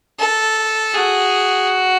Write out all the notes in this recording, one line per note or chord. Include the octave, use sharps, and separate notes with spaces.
A4
F#4 G#4